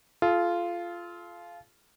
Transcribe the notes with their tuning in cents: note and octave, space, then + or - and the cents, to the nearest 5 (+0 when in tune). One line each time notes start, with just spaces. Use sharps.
F4 -10 A4 -40